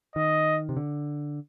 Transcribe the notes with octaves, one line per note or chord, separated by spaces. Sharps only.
D#3 D#5
C3
D3